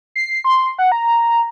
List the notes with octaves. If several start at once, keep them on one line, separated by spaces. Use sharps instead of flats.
C7
C6
F#5
A#5